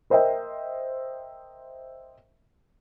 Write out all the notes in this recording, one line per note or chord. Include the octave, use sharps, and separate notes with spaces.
A#4 C5 D#5 E5 G5